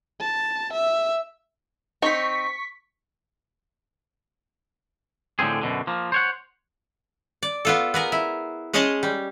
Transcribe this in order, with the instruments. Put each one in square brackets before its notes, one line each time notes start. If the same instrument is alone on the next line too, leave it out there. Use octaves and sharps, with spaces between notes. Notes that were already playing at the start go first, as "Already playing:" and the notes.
[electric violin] A5
E5
[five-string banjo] C4 D#4 [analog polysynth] C#6 B6
[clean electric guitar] A2 D3 F3 C4 G#4
F#2 B2 D3
F3 A#3
C5 C#5 F#5
[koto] D5
B3 F4 A4
B3 G#4 A#4
E4
G#3 C#4 G#4 C#5 D#5 A5
G3